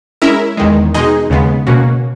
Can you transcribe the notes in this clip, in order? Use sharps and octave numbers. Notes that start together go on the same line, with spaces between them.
G#3 C#4 E4 A#4 E5
E2 D#3 G#3
B2 G#3 D#4 G#4 D#5
D#2 C#3 G#3 B3
B2 A#3 C#4 F#4